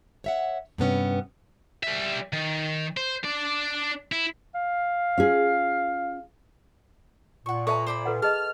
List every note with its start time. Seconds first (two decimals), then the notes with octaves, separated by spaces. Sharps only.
0.24 C#5 E5 F#5
0.78 G2 C3 B3 C#4
1.83 G3 E5
2.33 D#3
2.97 C5
3.24 D4 D5
4.12 E4
4.55 F5
5.18 C#4 F4 G#4
7.46 A#2 F#5 C#6
7.67 A4 B4 C#5 E5 A5 A#5
7.87 C5 D5 B5
8.05 A4 B4 F#5
8.22 G#4 D#5 A5 F6